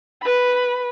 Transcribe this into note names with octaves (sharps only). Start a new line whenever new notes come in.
B4 B5